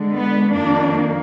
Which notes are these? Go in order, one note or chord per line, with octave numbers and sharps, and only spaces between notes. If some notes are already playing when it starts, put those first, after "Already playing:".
Already playing: D3 G#3
B3
F2 D#3 A#3 D4